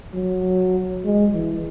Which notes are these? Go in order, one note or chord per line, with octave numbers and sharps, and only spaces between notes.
F#3
G#3
E3